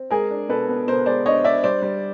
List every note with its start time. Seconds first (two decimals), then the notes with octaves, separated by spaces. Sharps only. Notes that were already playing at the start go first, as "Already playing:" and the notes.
Already playing: C4
0.11 G#3 G#4 A#4
0.31 D4
0.49 B2 A4 B4
0.69 B3
0.87 B2 A#4 C5
1.06 G#3 C5 D5
1.25 D4 C#5 D#5
1.44 D4 D5 E5
1.64 G3 C5 D5
1.82 G3